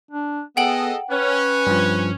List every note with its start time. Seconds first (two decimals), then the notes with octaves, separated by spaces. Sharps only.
0.11 D4
0.57 B3 G#4 A4 D#5 F#5 G5 F#7
1.11 C#4 B4
1.67 G2 F3